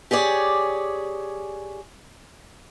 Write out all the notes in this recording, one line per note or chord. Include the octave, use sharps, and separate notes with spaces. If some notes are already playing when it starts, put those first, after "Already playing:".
G4 G#4 C#5 D5